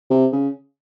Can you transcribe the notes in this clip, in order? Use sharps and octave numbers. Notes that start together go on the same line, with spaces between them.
C3
C#3